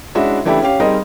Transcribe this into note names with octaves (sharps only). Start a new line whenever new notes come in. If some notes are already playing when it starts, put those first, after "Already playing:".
G#3 C#4 D4 E4 F#4 E5
C#3 E3 A3 D4 E4 G4
C#4 G4 F5
G3 C4 D#4 G#4 A#4 D#5